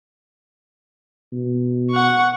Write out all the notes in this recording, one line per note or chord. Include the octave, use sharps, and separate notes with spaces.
B2
F#5 C#6